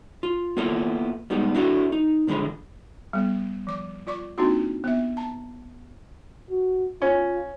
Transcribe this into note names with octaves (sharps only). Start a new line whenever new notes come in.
F4
A#3 B3 E4 F4 A4
G3 G#3 B3 D#4 G4
D4 E4 F#4 A4
D#4
C2 D3 F3 G#3 B5
G3 B3
F3 D6
F4 D5 C#6 D6
A#3 C4 D4 D#4 F4 F#4
B3 E5
A5 A#5
F#4
C#4 F4